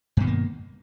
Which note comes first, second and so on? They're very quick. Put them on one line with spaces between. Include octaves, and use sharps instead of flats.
G2 B2 D#3 A#3